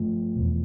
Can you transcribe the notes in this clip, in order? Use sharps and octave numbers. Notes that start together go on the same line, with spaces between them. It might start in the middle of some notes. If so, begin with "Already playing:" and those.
Already playing: G2 F3 A3
E2 B2